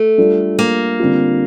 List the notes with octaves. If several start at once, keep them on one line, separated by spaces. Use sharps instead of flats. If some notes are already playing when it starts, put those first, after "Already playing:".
Already playing: A3
G3 D4 F4 A4
A#3
D3 G3 C4 F4